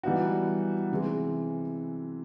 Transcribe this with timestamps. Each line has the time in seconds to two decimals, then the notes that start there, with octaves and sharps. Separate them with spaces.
0.03 E3 G3 B3 D#4 F#4
0.91 C3 E3 G#3